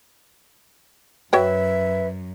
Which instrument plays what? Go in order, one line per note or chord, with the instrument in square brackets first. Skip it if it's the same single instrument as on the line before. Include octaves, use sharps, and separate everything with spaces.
[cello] F#2 [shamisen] F#4 C#5 G5 [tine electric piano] B4 [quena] E5